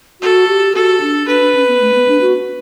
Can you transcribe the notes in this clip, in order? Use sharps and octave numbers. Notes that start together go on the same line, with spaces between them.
F#4 A4
G4
F#4 A4
D4
D4 B4
D4
C#4
B3
A3
B3
D4
F#4